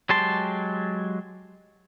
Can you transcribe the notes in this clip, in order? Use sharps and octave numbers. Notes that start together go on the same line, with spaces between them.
F#3 G#3 G4 A5 C6